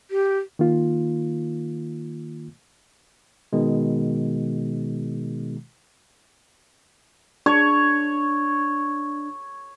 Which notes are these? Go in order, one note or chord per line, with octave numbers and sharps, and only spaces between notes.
G4
D#3 A#3 F4
B2 D#3 G#3
D4 C#5